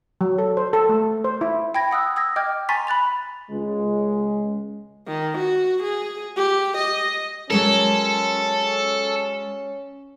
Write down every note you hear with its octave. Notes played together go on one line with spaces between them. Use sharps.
F#3
A4
C5
A4
A3
C5
E4
G5 B5 G#6 A#6
F#5 D#6 E6 F#6
D#6 E6 G#6 A#6
D#5 G5 D6 F6 G6 G#6
G#5 A#5 C6 C#6 A6 B6
B5 F#6 A6 F7
C#2 G#3
D#3
F#4
G#4
G4
D#5
F#3 G#3 C#4 A4 A#4